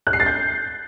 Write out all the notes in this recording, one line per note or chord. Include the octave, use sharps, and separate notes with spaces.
F#6
C7
A6
G6